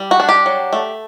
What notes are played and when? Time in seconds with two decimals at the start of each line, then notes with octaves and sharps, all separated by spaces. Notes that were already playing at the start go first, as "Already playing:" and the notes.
Already playing: G3
0.11 F#4
0.20 D4
0.29 G4
0.46 F#3
0.73 A3